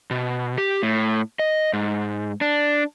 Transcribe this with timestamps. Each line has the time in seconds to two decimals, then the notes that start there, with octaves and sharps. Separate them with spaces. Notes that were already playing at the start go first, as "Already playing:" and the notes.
0.11 B2
0.58 G4
0.83 A2
1.39 D#5
1.73 G#2
2.41 D4